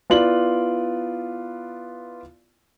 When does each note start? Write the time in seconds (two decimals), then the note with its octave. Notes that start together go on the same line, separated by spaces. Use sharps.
0.10 B3 E4 F4 D5 F#7